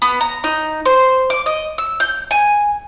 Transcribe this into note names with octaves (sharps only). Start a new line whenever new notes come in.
B3
A#5
D#4
C5
D6
D#5
E6
G6
G#5